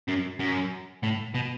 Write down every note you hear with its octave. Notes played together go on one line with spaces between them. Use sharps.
F#2
F#2
A2
B2